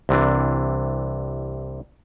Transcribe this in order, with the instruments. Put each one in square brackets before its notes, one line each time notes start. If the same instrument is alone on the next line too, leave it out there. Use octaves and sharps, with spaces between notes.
[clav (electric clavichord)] C2 C3 E3 D4